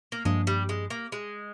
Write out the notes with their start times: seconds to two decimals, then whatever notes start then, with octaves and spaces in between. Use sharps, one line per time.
0.12 A#3
0.25 G2 F3 G#3 A#3 D4
0.47 G3
0.69 G#3
0.90 A#3
1.12 G#3